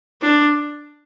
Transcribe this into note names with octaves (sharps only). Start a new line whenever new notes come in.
D4